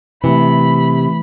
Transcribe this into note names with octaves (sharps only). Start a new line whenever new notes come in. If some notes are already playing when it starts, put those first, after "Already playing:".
C3 E3 A3 B5